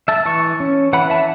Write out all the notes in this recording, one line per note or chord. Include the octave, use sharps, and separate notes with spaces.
E5 A5
E3 A5 C#6
C#4
E3 F#5 B5
E5 A5